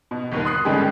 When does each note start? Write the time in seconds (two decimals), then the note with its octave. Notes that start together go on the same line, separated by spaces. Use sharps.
0.11 B2
0.32 G1 D#2 A#3
0.45 C6 D#6 F#6 C7
0.65 G#1 G2 D3 G#3 C#4 G4